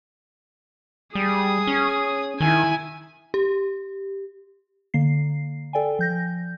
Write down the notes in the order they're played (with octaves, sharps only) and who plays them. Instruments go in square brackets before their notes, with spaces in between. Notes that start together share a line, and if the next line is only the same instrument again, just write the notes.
[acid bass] G3 [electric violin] G#4 D#6
[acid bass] C#4
[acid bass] D#3 [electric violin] E4 G#5
[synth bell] G4
D3 A#3 C7
A4 D5 G5 G#5
F3 G6 A#6